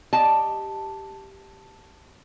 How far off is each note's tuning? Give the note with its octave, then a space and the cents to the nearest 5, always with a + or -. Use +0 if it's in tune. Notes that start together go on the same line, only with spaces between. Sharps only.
G4 +0 D#5 +0 A5 +0